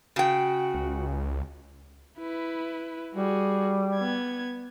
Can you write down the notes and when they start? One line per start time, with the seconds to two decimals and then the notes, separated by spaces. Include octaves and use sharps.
0.16 C#3 F#4 G5
0.74 C#2
2.18 E4 B4
3.14 G3 F#4 G#4
3.96 B3 G#6